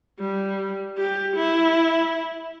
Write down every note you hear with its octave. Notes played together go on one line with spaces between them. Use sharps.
G3
G4
E4